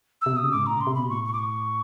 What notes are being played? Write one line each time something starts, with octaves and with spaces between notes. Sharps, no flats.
E6
C3
B2 D#6
C#3
G#2 D6
A2 A#5
C#3 C6
C3
B2 B5
A2 C#6
C#6
D6
C#6